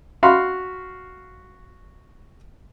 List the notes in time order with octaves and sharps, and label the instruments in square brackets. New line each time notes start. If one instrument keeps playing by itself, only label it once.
[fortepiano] F#4 F5 B5 C6